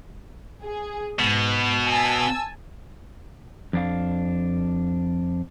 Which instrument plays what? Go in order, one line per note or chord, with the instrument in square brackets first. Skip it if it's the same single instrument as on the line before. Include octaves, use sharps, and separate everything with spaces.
[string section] G#4
[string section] G#2 [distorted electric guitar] B2
[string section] G#5 A5 E6
[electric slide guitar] F2 D4 F5